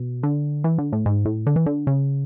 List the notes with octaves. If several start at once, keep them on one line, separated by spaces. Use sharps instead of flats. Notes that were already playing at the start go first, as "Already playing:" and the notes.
Already playing: B2
D3
E3
D3
A2
G#2
A2
D3
E3
D3
C#3